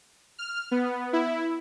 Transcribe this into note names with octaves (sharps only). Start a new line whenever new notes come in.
F6
B3
E4